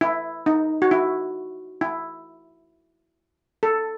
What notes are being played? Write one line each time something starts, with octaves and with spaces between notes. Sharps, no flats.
E4
D#4
F#4
E4
E4
A4